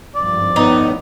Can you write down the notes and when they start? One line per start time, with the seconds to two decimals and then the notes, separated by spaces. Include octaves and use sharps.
0.15 G#1 G2 F3 D5
0.56 A2 B3 D#4